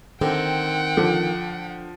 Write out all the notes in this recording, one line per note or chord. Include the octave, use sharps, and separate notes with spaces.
D3 D#3 C4 F#5 G5
D3 F3